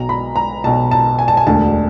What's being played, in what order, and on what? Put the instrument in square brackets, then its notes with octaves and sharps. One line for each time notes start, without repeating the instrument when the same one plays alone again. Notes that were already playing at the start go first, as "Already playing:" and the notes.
Already playing: [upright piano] B1 B2 A#5
B5
A#5
B1 B2 A5
A5
G#5
A5
G#5
E1 D2 D3 A5